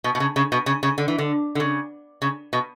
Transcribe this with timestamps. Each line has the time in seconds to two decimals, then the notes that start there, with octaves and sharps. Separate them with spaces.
0.04 B2
0.15 B2
0.20 C#3
0.36 C#3
0.52 B2
0.66 C#3
0.83 C#3
0.98 D3
1.08 E3
1.18 D3
1.55 D3
1.60 C#3
2.22 C#3
2.53 B2